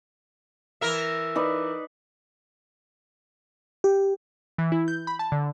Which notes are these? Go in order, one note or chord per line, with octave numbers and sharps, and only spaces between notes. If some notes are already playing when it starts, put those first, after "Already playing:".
E3 A#4 E5
D#4 B4 D5
G4
E3
E4
G6
B5
A5
D3